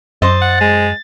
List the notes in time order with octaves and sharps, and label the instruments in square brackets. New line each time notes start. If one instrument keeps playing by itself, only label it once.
[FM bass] F#2 [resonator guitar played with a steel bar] C5 D#5 [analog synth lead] A6
[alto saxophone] F#5
G#3